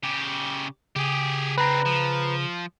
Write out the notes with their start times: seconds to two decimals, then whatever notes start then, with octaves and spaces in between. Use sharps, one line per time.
0.03 C#3 G4
0.96 C#3 G4 G#4
1.58 C4 D4 B4 A#5
1.86 F3